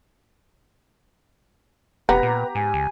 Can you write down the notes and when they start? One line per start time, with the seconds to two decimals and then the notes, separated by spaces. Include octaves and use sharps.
2.09 E1 B3 G4 B4 A#5
2.23 A#2
2.55 G#2 G#5
2.74 C#2